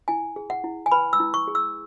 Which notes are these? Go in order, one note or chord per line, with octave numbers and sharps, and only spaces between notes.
E4 G#5
G#4
F#5
E4
G#5
B4 B5
E6
E4
C#6
G#4
E6